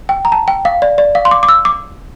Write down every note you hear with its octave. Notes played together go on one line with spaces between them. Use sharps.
G5
A#5
A5
G5
F5
D5
D5
F5
C6
D6
D6
E6
D6